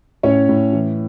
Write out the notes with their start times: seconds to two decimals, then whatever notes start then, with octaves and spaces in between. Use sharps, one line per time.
0.23 A2 C#4 C#5
0.49 A2
0.73 E3